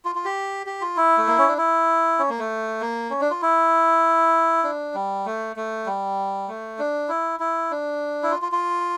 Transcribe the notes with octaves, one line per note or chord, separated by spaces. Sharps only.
F4
F4
G4
G4
F4
E4
A3
A#3
C#4
D4
E4
C#4
A#3
A3
A#3
C#4
D4
F4
E4
D4
G3
A3
A3
G3
A3
D4
E4
E4
D4
E4
F4
F4
F4